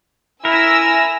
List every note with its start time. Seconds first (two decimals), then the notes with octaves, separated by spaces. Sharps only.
0.45 E4 A#4 G#5 E6 A#6